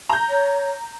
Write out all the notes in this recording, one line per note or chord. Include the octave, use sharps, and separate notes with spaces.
A#5 G6
C#5